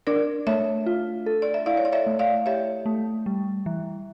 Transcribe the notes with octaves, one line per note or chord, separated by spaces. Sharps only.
D4 A#4 D5
A3 C#5 E5
F4
A4
D5
E5
E4 D5 F5
C#5
D5
C#5 E5
A3
D5 F5
G4 C#5 E5
A3
G3
E3